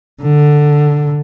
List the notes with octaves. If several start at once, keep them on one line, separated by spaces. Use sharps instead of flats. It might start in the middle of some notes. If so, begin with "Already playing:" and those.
D3